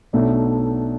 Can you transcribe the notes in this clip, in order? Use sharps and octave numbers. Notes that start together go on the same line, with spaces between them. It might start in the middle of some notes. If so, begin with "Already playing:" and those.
B1 B2 A3 D4